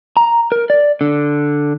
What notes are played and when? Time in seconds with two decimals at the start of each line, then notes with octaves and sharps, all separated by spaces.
0.17 A#5
0.52 A#4
0.70 D5
1.01 D3